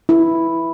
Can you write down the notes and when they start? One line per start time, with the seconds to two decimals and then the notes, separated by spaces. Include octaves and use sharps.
0.09 E4